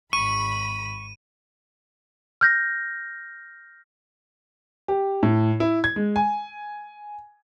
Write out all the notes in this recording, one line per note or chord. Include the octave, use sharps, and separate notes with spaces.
G#1 B5 C#6 D#7
F6 G6 A#6
G4
A2
E4
G#6
G#3
G#5